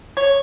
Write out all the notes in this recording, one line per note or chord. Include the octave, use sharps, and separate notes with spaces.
C#5